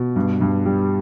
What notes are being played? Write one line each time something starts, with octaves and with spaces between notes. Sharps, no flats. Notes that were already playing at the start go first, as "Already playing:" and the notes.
Already playing: B2
G2
G2
G3